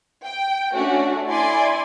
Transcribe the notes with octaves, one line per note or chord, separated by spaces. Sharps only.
G5
A3 C#4 D4 F#4
E4 D5 G#5 C6